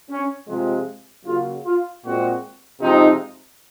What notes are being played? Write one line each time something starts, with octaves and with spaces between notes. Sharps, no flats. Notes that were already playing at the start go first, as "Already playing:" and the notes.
C#4
C3 F3 G#3
C#3 F#3 A#3 F4
F4
A#2 G#3 C4 F#4
C3 F3 G#3 C4 D#4